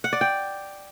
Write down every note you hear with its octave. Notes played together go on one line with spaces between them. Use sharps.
F#5
D5
G5